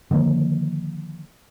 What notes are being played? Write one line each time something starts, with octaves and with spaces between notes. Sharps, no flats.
D3 D#3 F3 A#3